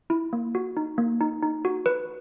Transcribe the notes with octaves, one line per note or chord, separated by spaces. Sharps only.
E4
A#3
F#4
D#4
A#3
D#4
D#4
F#4
B4